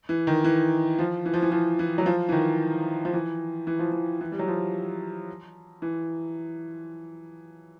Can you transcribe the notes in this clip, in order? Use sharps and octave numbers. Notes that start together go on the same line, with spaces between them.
E3
D#3
E3
F3
E3
F3
E3
F3
E3
F#3
F3
E3
D#3
F3
E3
E3
F3
E3
E3
G3
F#3
F3
E3